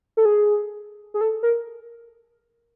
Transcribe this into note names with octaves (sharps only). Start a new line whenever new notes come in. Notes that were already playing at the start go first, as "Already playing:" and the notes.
A4
G#4
G#4
A4
A#4